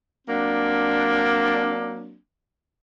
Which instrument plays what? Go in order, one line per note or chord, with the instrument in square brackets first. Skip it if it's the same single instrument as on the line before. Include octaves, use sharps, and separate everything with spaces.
[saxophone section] F#3 A#3 C4 D4